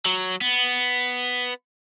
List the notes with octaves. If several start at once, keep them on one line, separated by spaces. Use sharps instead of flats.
F#3
B3